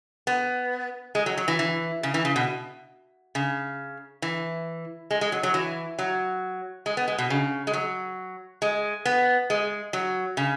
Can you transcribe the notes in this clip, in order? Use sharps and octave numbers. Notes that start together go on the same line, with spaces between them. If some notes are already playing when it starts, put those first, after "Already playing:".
B3
G#3
F#3
F#3
E3
E3
C#3
E3
C#3
B2
C#3
E3
G#3
G#3
F#3
F#3
E3
F#3
G#3
B3
G#3
B2
C#3
G#3
F#3
G#3
B3
G#3
F#3
C#3